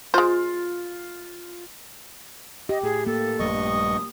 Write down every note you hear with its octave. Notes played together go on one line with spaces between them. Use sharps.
G#3 F4 C5
G4 D#5
A2 G#4
A#3 A4
A#1 G2 G3 A3 D#5 C#6
D#6